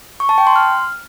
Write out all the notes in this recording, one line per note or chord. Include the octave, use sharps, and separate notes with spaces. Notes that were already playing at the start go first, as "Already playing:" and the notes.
C#6
A5
G5
C6
F6